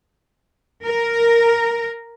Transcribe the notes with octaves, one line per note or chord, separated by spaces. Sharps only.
A#4